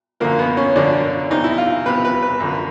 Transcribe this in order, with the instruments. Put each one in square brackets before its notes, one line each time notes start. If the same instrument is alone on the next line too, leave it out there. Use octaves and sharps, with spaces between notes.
[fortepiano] F#2 D3 F3 A#3
B3
C#4
F#2 D3 F3 D4
E2 C3 F3 D#4
E4
F4
E2 C3 F3 B4
B4
B4
F#2 D3 F3